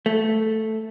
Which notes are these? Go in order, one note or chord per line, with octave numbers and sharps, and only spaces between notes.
A3